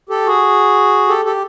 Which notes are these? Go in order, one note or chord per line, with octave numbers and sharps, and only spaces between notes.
G4 A4
F#4 G#4
G4 A4
G4 A4